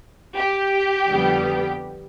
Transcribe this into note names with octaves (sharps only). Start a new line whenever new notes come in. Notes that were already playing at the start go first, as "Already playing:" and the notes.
G4
F2 D3 G3 B3